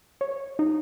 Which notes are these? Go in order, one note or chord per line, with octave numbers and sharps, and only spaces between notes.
C#5
D#4